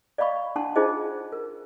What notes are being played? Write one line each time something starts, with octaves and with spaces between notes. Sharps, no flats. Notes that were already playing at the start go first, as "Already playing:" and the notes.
D5 D#5 F5 B5 C#6
D4 F#5 A5 C6
D4 D#4 F4 G#4 C5 D#5
A#4